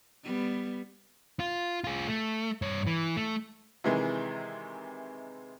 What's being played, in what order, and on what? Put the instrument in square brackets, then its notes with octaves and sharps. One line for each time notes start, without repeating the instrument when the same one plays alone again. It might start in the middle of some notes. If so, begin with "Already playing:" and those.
[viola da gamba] G3 B3
[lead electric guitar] F4
F4 G#4
A3
G2 C#5
E3
A3
[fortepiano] C3 D#3 E3 G#3